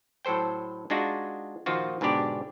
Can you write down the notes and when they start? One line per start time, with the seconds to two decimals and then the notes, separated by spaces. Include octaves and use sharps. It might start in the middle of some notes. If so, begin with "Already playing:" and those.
0.25 A2 F#3 A4 C5 G5
0.90 G#3 D4 D#4 F4 F#4 G#4
1.66 A#2 D#3 F3 F4 F#4
2.01 G#2 B2 D3 D4 G4 D5